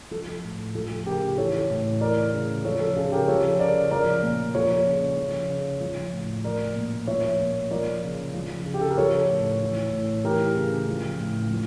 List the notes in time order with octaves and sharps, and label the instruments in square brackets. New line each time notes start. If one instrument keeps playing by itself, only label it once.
[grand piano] F3 A4
A2
F3 A4
C#3 G4 A#4
E3 A4 C#5
A2
E3 A#4 D5
C#3
F3 A4 C#5
A4
C#3 A4
G4 A#4
F3 A4 C#5
C#3 A#4 D5
F3 A#4 D5
A#2
F3 A4 C#5
C#3
F3
C#3
F3
A2
F3 A#4 D5
A#2
F3 C#5 E5
A#2
F3 A#4 D5
C#3
F3
C#3
G4
A4
A#4
F3 A4 C#5
A2
E3
A2
E3 G4 A#4
C#3
F3
A2
F3